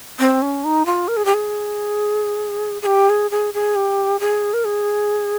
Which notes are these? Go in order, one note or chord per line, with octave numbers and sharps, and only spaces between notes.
C4
C#4
D#4
F4
A#4
G#4
G4
G#4
G#4
G4
G#4
G#4
G#4
G4
G#4
A#4
G#4